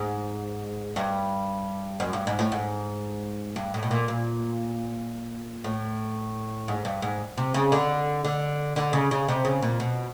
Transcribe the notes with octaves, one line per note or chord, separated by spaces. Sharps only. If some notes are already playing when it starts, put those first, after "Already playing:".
Already playing: G#2
G2
F#2
G2
G#2
A2
G#2
G2
A2
B2
A#2
A#2
A2
G#2
G2
G#2
C3
C#3
D3
D3
D3
C#3
C#3
C3
C#3
A#2
B2